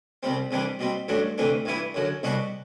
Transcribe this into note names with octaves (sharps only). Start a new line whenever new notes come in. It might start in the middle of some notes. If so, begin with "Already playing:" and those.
C2 C3 G3 C4
C2 C3 E3 G3 D4
B2 G3 C4
A1 G2 F#3 A3 D4
D2 C3 E3 A3 D4
G2 E3 B3 E4
F#2 D3 F#3
C2 B2 G3 D4 F#4